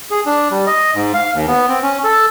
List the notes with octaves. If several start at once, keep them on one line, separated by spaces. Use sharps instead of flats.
G#4
D4
G3
D#5
G#2
F5
D#2
B3
C4
C#4
A4